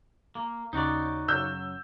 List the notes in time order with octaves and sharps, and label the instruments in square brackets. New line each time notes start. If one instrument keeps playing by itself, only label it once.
[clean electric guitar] A#3
[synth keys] D#2 C#3 [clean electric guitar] D#4 F#4 D5
[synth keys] F#2 C#3 F#3 [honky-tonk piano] E6 G6